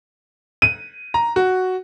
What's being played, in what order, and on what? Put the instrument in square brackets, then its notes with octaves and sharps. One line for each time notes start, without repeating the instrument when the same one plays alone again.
[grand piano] D#7
[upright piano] A#5
F#4